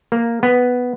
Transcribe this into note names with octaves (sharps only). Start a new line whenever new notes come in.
A#3
B3